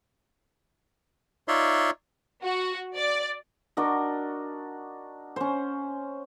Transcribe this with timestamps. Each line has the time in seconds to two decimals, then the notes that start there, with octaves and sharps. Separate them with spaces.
1.48 D#4 F4 C#5 D5 E5 C6
2.43 F#4
2.95 D5
3.77 D4 F#4 A#4 D#5
5.36 C#4 C5